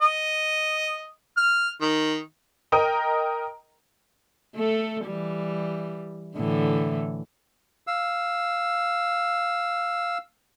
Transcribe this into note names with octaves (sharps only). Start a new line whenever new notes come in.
D#5
F6
D#3
A#4 D#5 G5 A#5 D#6
A3 A4
E3 G3
A2 D3 E3
F5 E6